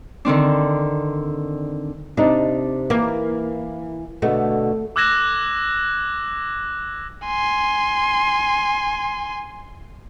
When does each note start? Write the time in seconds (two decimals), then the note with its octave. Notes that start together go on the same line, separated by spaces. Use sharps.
0.25 D3 D#3 C4 D4
2.17 C3 D4 D#4
2.90 E3 A#3
4.22 B2 D3 A3
4.96 D6 E6 F#6 G#6 A#6 E7
7.26 G#5 C6